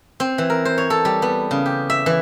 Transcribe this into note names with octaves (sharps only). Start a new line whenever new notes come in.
C4
E3
A#4
C5
C#5
A4
G3
B3
C#3
G4
E5
E3